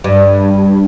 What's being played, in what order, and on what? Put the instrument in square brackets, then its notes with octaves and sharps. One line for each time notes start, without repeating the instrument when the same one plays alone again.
[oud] G2